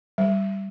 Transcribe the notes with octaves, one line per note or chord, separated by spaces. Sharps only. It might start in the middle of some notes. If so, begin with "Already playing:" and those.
G3